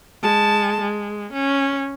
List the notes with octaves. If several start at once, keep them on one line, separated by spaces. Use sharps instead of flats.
G#3 A5
G#3
C#4